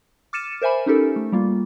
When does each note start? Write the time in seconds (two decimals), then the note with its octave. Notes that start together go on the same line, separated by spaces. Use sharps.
0.33 D6 F6 A6 C#7 D#7 E7
0.62 A#4 C5 E5 G#5 B5
0.86 C#4 D#4 G4 A4 A#4
1.16 A3
1.32 G3 A#3 F4